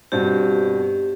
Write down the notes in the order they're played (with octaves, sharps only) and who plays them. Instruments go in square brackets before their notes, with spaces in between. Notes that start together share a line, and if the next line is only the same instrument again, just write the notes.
[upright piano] G2 B2 C4 [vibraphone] G4